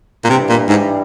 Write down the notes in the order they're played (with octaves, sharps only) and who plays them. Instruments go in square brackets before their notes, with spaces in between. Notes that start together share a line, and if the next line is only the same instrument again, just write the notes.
[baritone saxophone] A#2
[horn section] G2 E3 G3 [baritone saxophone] C3
[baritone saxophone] A#2
G#2